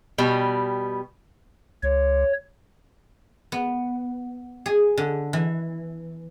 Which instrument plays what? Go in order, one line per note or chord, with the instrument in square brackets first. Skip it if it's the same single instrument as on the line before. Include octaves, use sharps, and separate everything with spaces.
[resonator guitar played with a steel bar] B2 G3
[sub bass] C#2 [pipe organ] C#5
[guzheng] B3
G#4
D3
E3